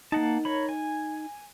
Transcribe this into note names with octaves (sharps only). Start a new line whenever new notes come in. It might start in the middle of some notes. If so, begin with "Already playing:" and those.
A#3 D#4 F#5 A5
A#4 C#5 B5
G#5